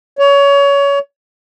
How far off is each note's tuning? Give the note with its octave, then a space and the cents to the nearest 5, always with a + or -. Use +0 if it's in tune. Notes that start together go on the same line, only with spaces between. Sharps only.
C#5 +25